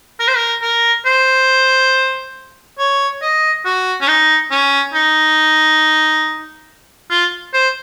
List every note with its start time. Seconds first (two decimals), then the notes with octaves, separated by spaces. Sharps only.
0.19 A#4
0.28 C5
0.36 A#4
0.62 A#4
1.06 C5
2.78 C#5
3.22 D#5
3.65 F#4
4.01 C#4
4.08 D#4
4.51 C#4
4.94 D#4
7.10 F4
7.54 C5